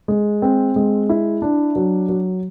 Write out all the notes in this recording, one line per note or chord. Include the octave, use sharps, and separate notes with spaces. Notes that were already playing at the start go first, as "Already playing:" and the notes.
G#3
C4
G#3
E4
D4
F#3
F#3